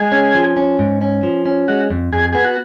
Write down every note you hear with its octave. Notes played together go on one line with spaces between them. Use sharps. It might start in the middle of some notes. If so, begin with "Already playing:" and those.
Already playing: G#3 G#4
C#4
F3
C#4
G#2
C#4
F3
C#4
G#3 F#4
F2
F2 G#4
B3 G#4
F#4